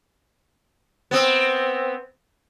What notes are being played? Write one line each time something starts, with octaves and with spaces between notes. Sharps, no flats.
B3 C4